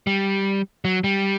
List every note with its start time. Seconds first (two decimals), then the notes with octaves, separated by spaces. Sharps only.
0.07 G3
0.85 F#3
1.04 G3